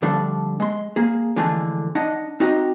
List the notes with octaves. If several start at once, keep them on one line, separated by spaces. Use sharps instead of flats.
D3 F3 G3 A3 D4
G#3 C6
A#3 G#4
D3 E3 F3 G#3 A3 D4
D4 D#4 D#5 F#5
C4 D#4 F#4 G4 D#5 A#5